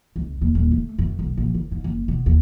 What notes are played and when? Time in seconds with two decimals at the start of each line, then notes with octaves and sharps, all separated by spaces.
0.16 C#2
0.41 D#2
0.55 D#1
0.72 A3
0.99 F#2
1.19 B1
1.37 A#1
1.55 D2
1.71 G#2
1.84 F#1
2.08 B2
2.26 D#2